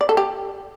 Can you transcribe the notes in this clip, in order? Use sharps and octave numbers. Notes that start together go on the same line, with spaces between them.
D5
A4
G4